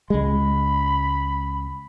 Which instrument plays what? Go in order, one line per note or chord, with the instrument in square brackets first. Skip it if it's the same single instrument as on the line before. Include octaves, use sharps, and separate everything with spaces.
[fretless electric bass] C#2 G#3 [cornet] B5